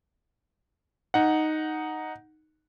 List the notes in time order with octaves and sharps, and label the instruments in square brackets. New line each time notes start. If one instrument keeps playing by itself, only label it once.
[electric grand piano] D#4 F#5